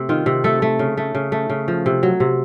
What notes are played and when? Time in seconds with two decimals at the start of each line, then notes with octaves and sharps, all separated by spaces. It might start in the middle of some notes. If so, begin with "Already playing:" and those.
Already playing: C3 A3
0.09 D#3 F4
0.26 C3
0.44 A3 A4
0.62 A3
0.79 C#3
0.97 A3
1.15 C#3
1.32 A3
1.50 C#3
1.68 F3
1.86 C3
2.03 F#3
2.20 C3